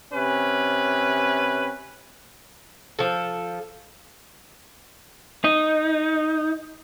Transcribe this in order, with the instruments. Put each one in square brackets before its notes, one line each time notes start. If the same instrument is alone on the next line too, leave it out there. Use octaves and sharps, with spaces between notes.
[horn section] C3 C#4 B4
[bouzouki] F3 A4
[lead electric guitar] D#4